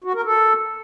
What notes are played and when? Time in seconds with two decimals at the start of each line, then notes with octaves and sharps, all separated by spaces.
0.04 F#4
0.14 A#4
0.24 A4